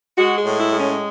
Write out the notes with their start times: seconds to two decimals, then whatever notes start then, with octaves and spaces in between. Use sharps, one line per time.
0.16 G#3 F#4
0.37 G#4
0.44 A2
0.58 E4
0.71 G#3
0.77 C#4